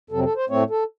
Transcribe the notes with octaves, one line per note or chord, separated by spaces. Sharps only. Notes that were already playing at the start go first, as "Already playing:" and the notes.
F2 C3 F#3 C4 A4
A4
C5
A2 A3 C4 C#5
A4